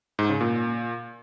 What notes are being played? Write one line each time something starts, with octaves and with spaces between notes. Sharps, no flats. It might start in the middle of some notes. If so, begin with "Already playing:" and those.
G#2
C#3
A#2